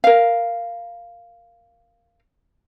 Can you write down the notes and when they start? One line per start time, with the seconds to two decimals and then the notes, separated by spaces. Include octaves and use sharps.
0.04 A#4 F5